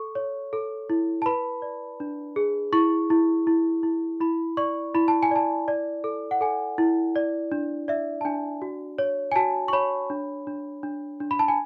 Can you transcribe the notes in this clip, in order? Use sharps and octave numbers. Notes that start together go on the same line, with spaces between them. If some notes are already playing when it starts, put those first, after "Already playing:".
Already playing: A4 C#6
C#5
A4
E4
A5
B4 B5
D5
D4
G#4
E4 C#6
E4
E4
E4
E4 B5
D5 C#6
E4 B5
A5
G#5
D5 A5
D5
A4
F#5
A4 G#5
E4
D5
D4
D5 E5
A5
D4 G#5
F#4
C#5
G#5
F#4 A5
C#6
C#5 B5
D4
D4
D4
D4
B5
A5
G#5